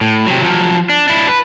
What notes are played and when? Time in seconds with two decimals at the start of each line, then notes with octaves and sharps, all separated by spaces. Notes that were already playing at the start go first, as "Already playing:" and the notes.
0.01 A2
0.27 C3 F#3
0.43 F3 F#3
0.90 D4
1.08 D4 E4
1.28 B4